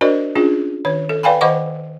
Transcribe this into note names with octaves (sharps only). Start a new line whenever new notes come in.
D4 F#4 A#4 C5 D5 D#5
C#4 D4 F4 G#4
D#3 C#5
A4
B4 D5 F5 G5 G#5 B5
D#3 C5 D#5 F#5 C#6 D6